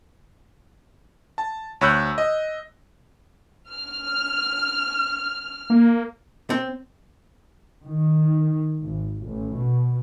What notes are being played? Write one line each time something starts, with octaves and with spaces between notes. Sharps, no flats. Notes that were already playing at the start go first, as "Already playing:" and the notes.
A5
D2 C#5 B5 E6 F#6 G6
D#5
F6
A#3
C4
D#3
G#1
A1
B2